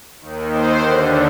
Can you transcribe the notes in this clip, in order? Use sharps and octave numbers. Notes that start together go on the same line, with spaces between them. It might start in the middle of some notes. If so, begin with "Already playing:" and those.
D#2 D#3
C5
D#2 D3